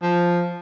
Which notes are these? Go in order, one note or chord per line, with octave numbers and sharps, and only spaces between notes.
F3